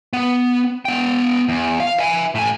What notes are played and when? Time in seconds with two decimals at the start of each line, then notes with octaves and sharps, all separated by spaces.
0.13 B3
0.85 B3 G5
1.49 E2
1.80 F5
1.99 E5 G#5
2.35 A2 G#5